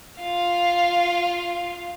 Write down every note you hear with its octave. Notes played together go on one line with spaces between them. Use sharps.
F4 F5